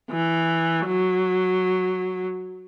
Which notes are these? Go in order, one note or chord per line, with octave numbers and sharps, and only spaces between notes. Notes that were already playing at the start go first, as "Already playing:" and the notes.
E3
F#3